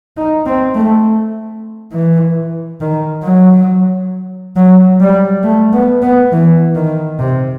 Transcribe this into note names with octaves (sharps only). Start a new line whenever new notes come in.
D#4
C4
A3
E3
D#3
F#3
F#3
G3
A3
B3
B3
E3
D#3
C3